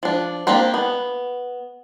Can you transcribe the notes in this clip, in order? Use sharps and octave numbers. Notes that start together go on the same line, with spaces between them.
F3 D4
A#3 C4 D4 G4 C5
B3